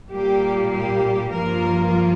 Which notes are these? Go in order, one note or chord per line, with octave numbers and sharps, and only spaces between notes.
A#2 G3 A#3 G4
G4
G2 F3 A#3 F4 A#4